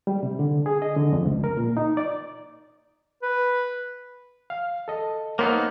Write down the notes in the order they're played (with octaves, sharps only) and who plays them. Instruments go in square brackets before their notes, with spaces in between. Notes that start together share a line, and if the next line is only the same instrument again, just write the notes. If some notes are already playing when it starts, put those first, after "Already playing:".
[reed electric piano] G3
C3
D3
G#4
D#5
D3
F2
C#2
A#4
A#2
D#4
D5
[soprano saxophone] B4
[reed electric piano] F5
A4 D#5
[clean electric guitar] A#3 B3 D#4 [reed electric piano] A#4 C5 C#5